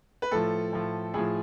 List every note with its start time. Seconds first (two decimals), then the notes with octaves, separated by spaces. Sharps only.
0.22 B4
0.31 A2 F3 A4
0.73 A2 F3
1.14 A2 F3 G#4